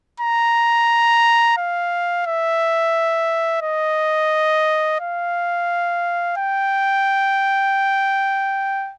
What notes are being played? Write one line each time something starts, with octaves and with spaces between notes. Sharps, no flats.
A#5
F5
E5
D#5
F5
G5